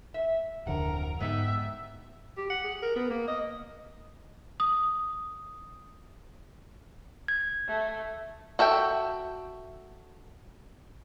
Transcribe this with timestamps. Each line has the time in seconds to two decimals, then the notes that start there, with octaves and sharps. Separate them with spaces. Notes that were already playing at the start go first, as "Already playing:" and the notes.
0.14 E5
0.67 D1 F2 D3 A#4 F#5
1.20 G#2 B3 D#4 G4 E5
2.38 G4
2.50 F#5
2.64 G#4
2.82 A#4
2.96 B3
3.10 A#3
3.28 D#5
4.60 D#6
7.28 G#6
7.67 A3
8.59 F#4 A4 E5 G5